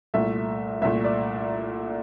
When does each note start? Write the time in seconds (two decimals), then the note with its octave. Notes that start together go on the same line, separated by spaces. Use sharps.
0.14 C2 A#2 A3 E5
0.82 C2 A#2 A3 E5
1.05 D5